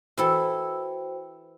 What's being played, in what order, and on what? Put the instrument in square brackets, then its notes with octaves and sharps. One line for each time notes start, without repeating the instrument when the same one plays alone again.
[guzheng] E3 E4 A4 [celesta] F#4 C5 G5